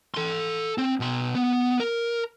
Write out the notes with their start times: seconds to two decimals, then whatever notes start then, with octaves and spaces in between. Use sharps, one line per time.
0.14 A4 C6
0.78 C4
1.00 B2 C6
1.35 B3
1.80 A#4